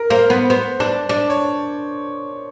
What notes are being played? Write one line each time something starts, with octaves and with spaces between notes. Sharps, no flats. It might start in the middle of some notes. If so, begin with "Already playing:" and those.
Already playing: A#4
A#3 C5
B3 B4
B3 C5
D4
D4 D5
C#5